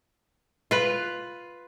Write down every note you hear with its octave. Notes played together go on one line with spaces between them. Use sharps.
F4 B4